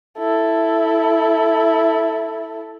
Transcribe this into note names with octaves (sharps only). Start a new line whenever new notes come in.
E4 A4